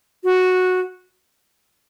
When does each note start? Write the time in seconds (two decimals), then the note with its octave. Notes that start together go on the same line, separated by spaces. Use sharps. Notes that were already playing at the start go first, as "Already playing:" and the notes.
0.24 F#4